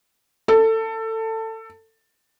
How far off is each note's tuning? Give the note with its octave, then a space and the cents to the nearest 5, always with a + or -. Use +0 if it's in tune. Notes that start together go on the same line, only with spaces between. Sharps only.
A4 +20